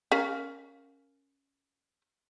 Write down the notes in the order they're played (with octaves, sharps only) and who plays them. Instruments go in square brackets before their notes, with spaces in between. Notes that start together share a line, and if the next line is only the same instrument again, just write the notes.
[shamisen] C#4 A#4 F5